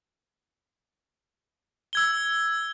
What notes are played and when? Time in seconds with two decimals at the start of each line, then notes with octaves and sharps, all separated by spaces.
1.93 E6 G#6 G7